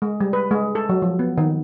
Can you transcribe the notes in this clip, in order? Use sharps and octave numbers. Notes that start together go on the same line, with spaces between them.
G#3
G3
B4
G#3
A4
F#3
F3
B3
D#3